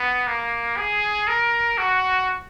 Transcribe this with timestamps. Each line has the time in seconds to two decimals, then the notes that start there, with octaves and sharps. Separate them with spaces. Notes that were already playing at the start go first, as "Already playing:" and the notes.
Already playing: B3
0.27 A#3
0.77 G#4
1.27 A#4
1.78 F#4